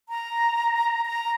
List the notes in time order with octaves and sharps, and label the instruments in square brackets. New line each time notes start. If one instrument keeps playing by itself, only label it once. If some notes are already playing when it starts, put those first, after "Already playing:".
[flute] A#5
A#5